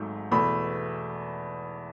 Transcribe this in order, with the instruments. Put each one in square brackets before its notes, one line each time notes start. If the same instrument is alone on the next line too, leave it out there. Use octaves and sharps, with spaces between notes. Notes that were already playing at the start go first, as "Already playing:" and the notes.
Already playing: [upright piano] G#1 G#2 F#3 A3
E2 B2 A3 B5